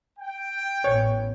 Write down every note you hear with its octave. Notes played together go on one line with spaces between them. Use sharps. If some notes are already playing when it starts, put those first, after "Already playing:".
G5
A1 B3 C#5